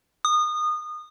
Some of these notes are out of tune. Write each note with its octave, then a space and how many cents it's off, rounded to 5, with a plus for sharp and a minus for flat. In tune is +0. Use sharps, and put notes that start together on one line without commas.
D#6 -25